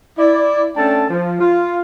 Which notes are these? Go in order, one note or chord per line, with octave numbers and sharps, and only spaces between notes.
E4 D5
A3 C#4 D4 A4 G5 A5
F3
F4